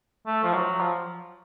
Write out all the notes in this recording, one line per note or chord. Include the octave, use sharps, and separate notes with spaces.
A3
F3
F#3
F3